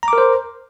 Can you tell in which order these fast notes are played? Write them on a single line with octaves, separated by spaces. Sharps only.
A#5 D6 A#4 C5